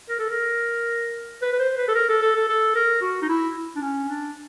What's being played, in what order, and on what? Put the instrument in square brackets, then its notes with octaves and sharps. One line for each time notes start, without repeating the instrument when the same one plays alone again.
[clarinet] A#4
A4
A#4
B4
B4
C5
B4
A4
A#4
A4
A4
A4
A4
A#4
F#4
D#4
E4
D4
C#4
D4